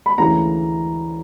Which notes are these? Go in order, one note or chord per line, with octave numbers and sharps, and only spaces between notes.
B5
D2 C#3 E3 A#5